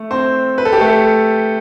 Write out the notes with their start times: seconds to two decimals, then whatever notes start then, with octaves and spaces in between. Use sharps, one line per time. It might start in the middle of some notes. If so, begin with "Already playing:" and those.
Already playing: A3
0.11 C4 C5
0.58 B4
0.65 A4
0.73 G4
0.80 A3 A4